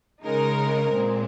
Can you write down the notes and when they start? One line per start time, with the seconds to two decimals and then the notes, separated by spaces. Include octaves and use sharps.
0.25 C#3 G#3 D#4 A#4
0.95 A#2 G#3 C4